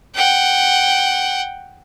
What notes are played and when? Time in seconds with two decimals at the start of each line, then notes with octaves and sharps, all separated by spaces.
0.15 F#5 G5